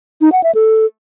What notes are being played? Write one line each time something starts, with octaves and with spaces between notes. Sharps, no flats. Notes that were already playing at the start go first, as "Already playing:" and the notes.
D#4
F#5
E5
A4